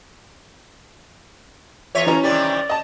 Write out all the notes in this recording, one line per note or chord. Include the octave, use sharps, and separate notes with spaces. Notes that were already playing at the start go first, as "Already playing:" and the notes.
E2 F4 C#5 E5
E3 C#4 A#5
C3 D#3 G3 D5
D#5 A5